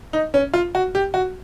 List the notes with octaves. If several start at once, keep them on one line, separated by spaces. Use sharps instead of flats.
D#4
C#4
F4
F#4
G4
F#4